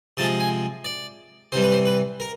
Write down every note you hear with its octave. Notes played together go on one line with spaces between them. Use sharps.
C3 F3 G#3 A5
G#5
D5
C3 E3 G3 C5
B4
C5
B4
A#4